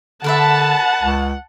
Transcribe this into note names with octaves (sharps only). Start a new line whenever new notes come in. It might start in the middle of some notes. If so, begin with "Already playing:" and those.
D3 A#4 B4 E5 F#5 A5
C#2